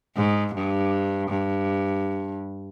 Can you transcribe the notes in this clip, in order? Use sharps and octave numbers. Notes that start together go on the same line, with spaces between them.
G#2
G2
G2